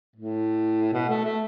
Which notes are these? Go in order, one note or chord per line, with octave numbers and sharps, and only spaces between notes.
A2
B2
A3
A3